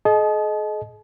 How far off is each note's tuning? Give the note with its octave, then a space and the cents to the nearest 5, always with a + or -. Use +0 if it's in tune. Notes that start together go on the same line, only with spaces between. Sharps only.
G#4 +45 D#5 +0 A5 -40